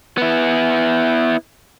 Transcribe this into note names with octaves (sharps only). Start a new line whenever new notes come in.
B3 E4